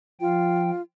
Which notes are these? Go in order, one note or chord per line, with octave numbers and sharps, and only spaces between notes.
F3 F4 G5